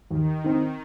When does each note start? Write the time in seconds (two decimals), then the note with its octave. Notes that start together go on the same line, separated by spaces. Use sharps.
0.10 D#2 D#3
0.44 D#3 C4 D#4